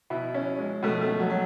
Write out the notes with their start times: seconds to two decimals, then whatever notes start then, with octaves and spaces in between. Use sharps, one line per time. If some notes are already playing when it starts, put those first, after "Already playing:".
0.10 B2 E4
0.34 C#4
0.58 G#3
0.83 B2 A3
1.01 A3
1.20 F#3
1.30 F#3